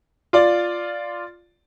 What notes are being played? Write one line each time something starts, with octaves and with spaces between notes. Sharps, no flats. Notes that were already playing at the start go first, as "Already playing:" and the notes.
F4 D5